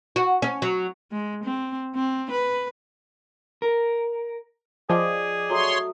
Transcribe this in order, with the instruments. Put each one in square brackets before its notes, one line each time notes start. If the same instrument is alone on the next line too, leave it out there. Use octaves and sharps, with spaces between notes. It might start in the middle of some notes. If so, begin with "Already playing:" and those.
[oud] F#4
C#4
F#3
[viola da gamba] G#3
C4
C4
B4
[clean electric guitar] A#4
[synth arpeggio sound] F3 F4 [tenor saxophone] G#4 [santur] D5 D#5 G5
[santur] F#3 A3 D#6 [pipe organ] C#5 C6